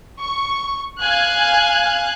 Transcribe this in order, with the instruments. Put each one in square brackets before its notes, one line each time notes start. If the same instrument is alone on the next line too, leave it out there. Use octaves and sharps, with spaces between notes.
[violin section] C#6
F5 G#5 F#6 G#6